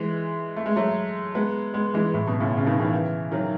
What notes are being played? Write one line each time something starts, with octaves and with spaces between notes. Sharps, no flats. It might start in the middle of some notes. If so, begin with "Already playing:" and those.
Already playing: E3 G#3
A3
G#3
F#3 A3
G#3 B3
G#3 B3
E3 G#3
A2
B2
A2 C#3
C#3
B2 D#3
C#3 E3
D#3 F#3